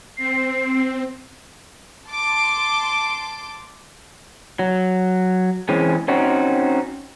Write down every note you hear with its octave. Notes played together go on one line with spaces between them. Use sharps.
C4 C7
A5 C6 D6
F#3
E3 G#3 C4 C#4 G#4
C4 C#4 D#4 F#4